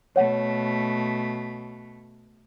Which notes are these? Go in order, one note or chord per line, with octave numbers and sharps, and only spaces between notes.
B2 A3 C#5 F#5